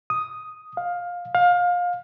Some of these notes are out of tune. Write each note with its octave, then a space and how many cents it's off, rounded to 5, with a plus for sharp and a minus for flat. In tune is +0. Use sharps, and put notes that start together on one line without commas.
D#6 +5
F5 +15
F5 +25